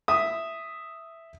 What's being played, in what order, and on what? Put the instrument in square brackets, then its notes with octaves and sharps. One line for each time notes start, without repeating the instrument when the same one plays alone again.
[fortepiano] E5 D#6